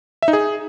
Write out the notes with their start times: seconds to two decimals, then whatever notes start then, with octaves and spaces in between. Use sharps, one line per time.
0.22 E5
0.28 D#4
0.33 G#4